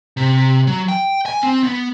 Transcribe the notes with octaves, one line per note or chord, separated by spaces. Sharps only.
C3
F#3
G5
G#5
C4
B3